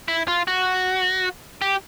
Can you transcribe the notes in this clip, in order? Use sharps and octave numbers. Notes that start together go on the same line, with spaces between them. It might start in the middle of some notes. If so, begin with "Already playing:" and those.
E4
F4
F#4
G4